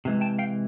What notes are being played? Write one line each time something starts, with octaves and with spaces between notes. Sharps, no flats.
C3 E3 G#3
G5 A5
F5 G5